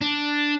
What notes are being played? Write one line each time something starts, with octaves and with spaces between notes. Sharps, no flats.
D4